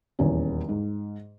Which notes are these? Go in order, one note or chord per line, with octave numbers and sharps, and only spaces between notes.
D#1 E2 C#4
G#2